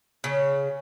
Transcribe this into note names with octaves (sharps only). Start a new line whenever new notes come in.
C#3